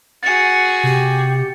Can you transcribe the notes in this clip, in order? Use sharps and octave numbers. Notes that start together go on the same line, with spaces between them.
F#4 G#4 A6 C#7
C3 G4